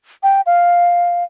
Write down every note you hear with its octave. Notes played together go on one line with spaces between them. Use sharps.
G5
F5